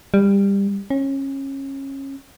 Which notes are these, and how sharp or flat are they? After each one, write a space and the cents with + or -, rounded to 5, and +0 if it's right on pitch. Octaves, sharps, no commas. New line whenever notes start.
G3 +20
C#4 -25